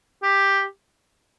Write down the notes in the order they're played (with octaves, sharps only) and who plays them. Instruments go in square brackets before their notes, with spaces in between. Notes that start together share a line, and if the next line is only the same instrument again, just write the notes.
[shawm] G4